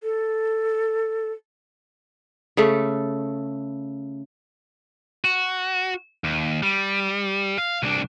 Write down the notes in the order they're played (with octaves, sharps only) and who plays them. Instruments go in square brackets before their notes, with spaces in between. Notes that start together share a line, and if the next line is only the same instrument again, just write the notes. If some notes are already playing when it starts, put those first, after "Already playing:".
[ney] A4
[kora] C#3 A3 A4
[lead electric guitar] F#4
D#2
G3
F5
C2 D4